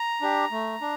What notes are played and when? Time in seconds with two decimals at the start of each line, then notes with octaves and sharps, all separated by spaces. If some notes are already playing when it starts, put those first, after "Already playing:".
Already playing: A#5
0.21 D4 G4
0.52 A3
0.81 D4